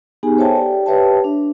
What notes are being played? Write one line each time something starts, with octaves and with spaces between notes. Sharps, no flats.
B3 D#4 G4 G#4 G#5
A4 C5 C#5 E5 G5 A5
G4 D5 G5
G4 B4 C#5 E5 G5 A5
D4